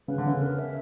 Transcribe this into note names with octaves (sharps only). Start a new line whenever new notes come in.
C#3 B4
D3
C#3
A#4
E5